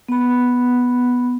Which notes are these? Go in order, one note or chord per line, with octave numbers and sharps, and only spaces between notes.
B3 B5